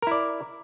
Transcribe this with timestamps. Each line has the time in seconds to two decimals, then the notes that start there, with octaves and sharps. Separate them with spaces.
0.02 A#4
0.07 E4
0.12 D5